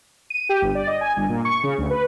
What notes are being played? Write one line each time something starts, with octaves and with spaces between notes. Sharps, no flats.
D#7
G4
G1
D5
D#5
G#5
G1
A#2
C#6
C#3
D2
B4